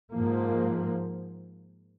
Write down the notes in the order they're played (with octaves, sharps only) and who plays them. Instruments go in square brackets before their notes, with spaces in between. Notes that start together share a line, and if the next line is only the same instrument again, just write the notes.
[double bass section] G#2 F3 A#3